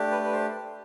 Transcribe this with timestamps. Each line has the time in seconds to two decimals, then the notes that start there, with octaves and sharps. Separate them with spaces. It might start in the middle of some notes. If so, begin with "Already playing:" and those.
Already playing: A3 D4 G4
0.11 B4
0.24 B4
0.32 C5